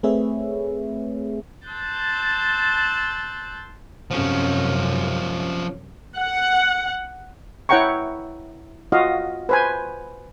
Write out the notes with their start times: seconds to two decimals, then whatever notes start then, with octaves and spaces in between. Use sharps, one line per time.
0.03 A3 C4 G#4 B4 C#5 E5
1.68 A5 C6 E6 F#6 G6 A6
4.11 F#2 C3 F3 C#4
6.17 F#5
7.69 E4 C#5 F#5 G5 A#5 C#6
8.92 F4 F#4 D#5 F5
9.49 B4 C5 G#5